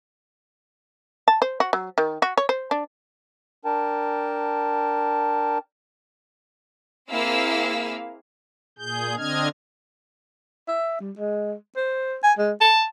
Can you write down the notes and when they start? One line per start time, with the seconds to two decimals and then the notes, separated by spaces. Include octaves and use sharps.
1.28 A5
1.42 C5
1.60 F#4
1.73 F#3
1.98 D#3
2.22 F#4
2.37 C#5
2.49 C5
2.71 D4
3.65 D4 A#4 G5 A5
7.11 A#3 C4 E4 G#4 F5 E6
8.79 A#2 G#4 G6
9.17 D3 C4 D4 D#5 F6 G#6
10.68 E5
11.00 G3
11.17 G#3
11.76 C5
12.23 G#5
12.38 G#3
12.61 A5